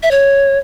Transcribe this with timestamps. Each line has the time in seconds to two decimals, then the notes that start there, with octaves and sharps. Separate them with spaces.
0.03 E5
0.11 C#5